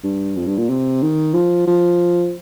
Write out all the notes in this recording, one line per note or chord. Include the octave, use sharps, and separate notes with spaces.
G2
F2
G2
A#2
C3
D#3
F3
F3